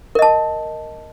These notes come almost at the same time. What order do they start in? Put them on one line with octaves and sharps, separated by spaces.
A#4 D#5 A5